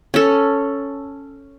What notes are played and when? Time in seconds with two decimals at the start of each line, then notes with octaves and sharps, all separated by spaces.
0.14 C#4 A4